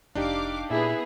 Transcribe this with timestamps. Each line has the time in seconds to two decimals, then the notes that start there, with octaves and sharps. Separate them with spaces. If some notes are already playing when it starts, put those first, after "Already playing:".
0.15 F1 D4 D#4 G4 F5 D6
0.71 A#2 B3 E4 G#4